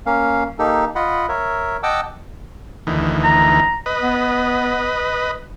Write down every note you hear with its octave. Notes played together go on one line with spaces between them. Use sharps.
A#3 C#4 F5
A#3 D#4 G4 A4
F4 D#5 F#5 B5
A#4 C#5 E5
D#5 F#5 G5 A5 D6 E6
D2 D#3 E3
A#5
B4 D#5
B3